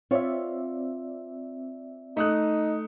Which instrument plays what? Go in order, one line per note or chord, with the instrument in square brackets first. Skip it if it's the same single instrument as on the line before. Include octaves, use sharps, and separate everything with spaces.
[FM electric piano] C4 D5 E5 [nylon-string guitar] F4 C#5
[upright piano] A3 D#6 F#6 [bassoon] D#4